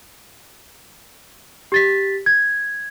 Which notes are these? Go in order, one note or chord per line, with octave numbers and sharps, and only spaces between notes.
G4 A6 B6
G#6